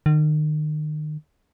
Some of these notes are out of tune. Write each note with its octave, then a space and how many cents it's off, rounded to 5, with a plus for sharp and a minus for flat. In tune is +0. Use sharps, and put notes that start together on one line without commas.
D#3 -35